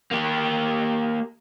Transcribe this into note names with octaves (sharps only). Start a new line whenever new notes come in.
A#3 G4